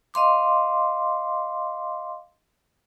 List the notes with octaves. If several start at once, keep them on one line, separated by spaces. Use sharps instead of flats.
D#5 F5 C6 D6